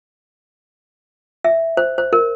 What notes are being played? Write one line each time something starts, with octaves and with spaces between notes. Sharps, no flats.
E5
C5
C5
A#4